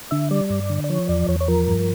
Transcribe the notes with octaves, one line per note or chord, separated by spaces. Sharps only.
D3 E5
G3 D5
G2
D3
D5
F3 C#5
E2 D5
E2 C#5
C#5
F3 A#4
G2